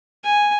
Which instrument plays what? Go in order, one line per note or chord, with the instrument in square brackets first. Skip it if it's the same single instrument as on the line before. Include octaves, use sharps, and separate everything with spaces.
[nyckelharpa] G#5